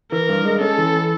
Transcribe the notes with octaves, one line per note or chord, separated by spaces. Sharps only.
E3 A#4
G2
G#3
C#4 A4
E3